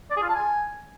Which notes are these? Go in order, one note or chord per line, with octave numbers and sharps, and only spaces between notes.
D5
G#4
F4
A5
G#5